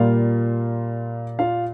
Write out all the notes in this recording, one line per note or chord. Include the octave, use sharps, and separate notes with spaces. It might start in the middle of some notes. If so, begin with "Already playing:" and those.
Already playing: A#2 G3 A#3 F4 F5
F4 F5